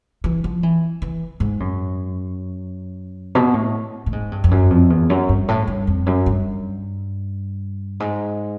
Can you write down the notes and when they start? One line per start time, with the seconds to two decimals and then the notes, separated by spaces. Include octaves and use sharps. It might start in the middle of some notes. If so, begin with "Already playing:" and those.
0.24 E3
0.44 F3
0.63 E3
1.02 E3
1.40 G#2
1.60 F#2
3.35 B2
3.54 A2
4.06 A2
4.13 G#2
4.32 G2
4.44 F2
4.51 F#2
4.70 F2
4.90 E2
5.10 F#2
5.29 G2
5.48 A2
5.68 G2
5.87 F2
6.06 F#2
6.26 G2
8.00 G#2